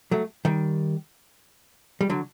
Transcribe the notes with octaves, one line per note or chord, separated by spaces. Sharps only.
F#3 A3
D#3 G3
G3
D3 F#3